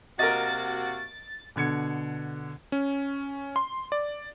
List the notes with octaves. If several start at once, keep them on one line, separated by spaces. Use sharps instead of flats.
C3 A#3 F#4 A#4 D#5 A6
B2 D3 G#6 C#7
C#4
C6
D5